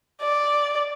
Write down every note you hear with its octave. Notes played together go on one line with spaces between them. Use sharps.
D5